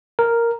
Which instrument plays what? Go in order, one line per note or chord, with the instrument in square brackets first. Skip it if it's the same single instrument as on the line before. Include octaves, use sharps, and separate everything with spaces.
[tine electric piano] A#4